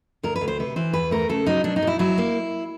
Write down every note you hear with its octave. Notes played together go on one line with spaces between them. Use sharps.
D2 A#4
B4
D2
C5
C3 B4
E3 C5
E2 B4
A3 A#4
C#3 A4
F#3 D#4
B2 D4
D#4
B2 E4
F#3 E4
A#3